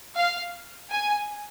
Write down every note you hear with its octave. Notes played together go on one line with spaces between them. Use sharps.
F5
G#5